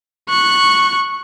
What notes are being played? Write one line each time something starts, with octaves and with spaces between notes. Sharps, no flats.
C#6 F#6